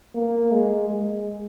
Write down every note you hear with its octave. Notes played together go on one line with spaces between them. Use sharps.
A#3
G#3
G#3